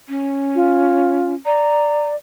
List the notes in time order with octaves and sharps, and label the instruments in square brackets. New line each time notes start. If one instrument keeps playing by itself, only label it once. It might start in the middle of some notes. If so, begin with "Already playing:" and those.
[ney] C#4
[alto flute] F4
[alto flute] D5 [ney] A#5